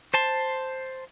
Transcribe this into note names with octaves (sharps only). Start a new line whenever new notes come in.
C5 A5 C6